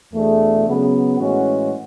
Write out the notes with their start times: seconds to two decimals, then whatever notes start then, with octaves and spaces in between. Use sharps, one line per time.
0.12 E2 B2 A3 D4 G#4
0.66 C#3 F#3 B3
1.19 A2 E3 G#3 C#4 F#4